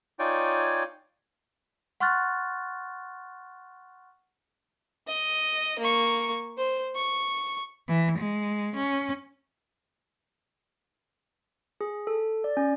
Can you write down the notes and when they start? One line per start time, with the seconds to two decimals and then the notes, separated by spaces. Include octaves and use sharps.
0.19 D#4 F4 C#5 D5 G5 G#5
2.00 F#5 C6 C#6 F6 F#6 A6
5.07 D#5
5.79 A#3 C#6
6.57 C5
6.95 C#6
7.88 E3
8.19 G#3
8.76 C#4
11.81 G#4
12.07 A4
12.44 D5
12.57 C#4